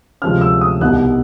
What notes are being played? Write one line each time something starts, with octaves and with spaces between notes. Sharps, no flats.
D2 C3 F3 G#3 C#4 F6
E6
D#6
C2 B2 G3 B3 D#4 F#6